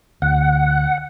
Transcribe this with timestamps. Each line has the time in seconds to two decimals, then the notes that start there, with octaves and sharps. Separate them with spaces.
0.22 D2 F#5